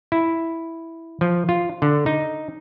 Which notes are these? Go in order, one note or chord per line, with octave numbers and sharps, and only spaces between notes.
E4
F3
F4
D3
D#4